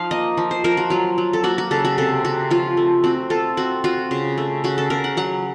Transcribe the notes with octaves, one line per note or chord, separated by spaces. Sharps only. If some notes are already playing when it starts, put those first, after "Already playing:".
Already playing: F3 D#4 F5
A#3 D#5
F3
C5
F3 A#4
F#4
F#3 F4
F#3
A4
A#3 F#4
F#4
C#3 A4
F#4
C3 A4
C3 F#4
F3 F4
A3
C4 F#4
F4 A4
C4 F#4
F4 F#4
C#3
A3
C#3 F#4
A4
C#3 A#4
F#5
F#3 F#5